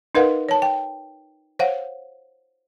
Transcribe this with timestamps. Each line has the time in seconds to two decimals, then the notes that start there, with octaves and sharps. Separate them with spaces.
0.15 D#4 A#4 B4 D#5 F5 F#5
0.49 C#5 A5
0.62 G5
1.59 C5 C#5 F5 F#5